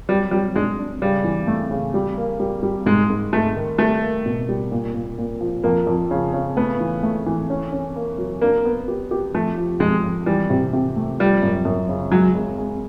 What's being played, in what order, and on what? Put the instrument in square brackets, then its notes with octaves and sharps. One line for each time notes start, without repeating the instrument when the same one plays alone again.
[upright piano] F#3 [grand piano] G3
[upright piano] F#3 [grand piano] G3
[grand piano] G#3 [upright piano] D4
[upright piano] D4
[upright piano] C#3 [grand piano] G3
[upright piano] E3
A3
C#3
G3
A#3
G3
G3
[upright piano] G#2 [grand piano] G#3
[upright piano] G#2
[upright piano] G#2 [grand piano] A3
[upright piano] D#3
[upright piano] G3 [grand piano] A3
[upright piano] A#3
B2
G3
A#2
A#2
A#2
F3
[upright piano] F2 [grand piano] A#3
[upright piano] F2
C#3
C#3
[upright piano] A3 [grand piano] B3
[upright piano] E3
A3
E3
C#4
C#4
A#3
F#3
[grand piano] A#3 [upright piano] D4
[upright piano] B3
G4
G4
[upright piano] F2 [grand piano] A3
[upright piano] F3
[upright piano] F2 [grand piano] G#3
[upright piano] F2
[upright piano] E3 [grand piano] G3
[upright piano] C3
C3
A3
[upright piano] F3 [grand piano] G3
[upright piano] F#2
F#2
C#3
[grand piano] F#3 [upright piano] G#3
[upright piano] G#3
G#3